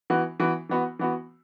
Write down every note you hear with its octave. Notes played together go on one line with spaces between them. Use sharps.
E3 B3 F#4
E3 B3 F#4
E3 B3 F#4
E3 B3 F#4